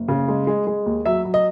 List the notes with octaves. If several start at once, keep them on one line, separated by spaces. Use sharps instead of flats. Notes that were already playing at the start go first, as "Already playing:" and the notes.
Already playing: F#1
C#3
G#3
G#3
G#3
D#2
F#3 E5
F#3
D#5